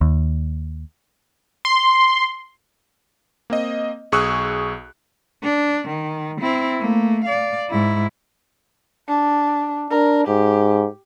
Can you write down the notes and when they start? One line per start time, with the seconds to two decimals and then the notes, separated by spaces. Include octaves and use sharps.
0.01 D#2
1.65 C6
3.50 A#3 C4 D#5
4.12 B1 G#4 C#6 D#6 E6 F#6
5.43 D4
5.88 D#3
6.41 C4 E4
6.80 A3 A#3
7.24 D5 F5
7.70 G#2 E4
9.08 D4
9.91 D4 A#4
10.28 G#2 G4